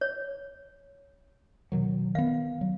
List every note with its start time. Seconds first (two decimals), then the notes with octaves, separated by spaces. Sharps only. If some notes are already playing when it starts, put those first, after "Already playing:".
0.01 C#5
1.72 B2 D#3 F#3
2.15 D#3 B3 F5
2.61 F#3